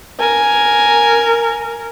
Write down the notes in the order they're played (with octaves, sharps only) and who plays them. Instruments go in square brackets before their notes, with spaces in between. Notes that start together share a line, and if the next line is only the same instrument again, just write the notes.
[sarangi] A#4 [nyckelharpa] G#5